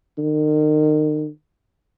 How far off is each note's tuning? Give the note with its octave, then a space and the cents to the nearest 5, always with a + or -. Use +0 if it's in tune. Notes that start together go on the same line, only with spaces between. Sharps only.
D#3 -35